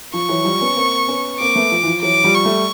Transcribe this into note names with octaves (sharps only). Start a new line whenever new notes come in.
F3 C#6
E3 F#3
F3 G3
B3 C#4
A#3 C4
B3 C#4
A#3 C4 D6
A3 B3
F3
E3
F3
E3 F#3 D6
F3 G3
C#6
G3 A3